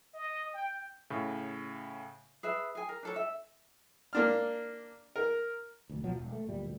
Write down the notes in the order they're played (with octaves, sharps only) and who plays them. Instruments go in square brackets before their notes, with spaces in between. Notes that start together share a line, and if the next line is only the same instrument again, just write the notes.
[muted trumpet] D#5
G5
[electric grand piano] A2 C#3
[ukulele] G#4 B4 E5
G#4 G#5
A#4
D4 A4 C#5
E5
[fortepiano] A#3 D4 F6
A#4
[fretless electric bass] F1 D2
D1 B2 F3 F#3
E1
A3
D1 A#2 G3
D2